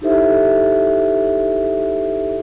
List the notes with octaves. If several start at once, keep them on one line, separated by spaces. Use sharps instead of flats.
D#4 E4 G4 A4 C5 E5